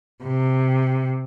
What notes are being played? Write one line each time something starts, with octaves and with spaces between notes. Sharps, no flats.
C3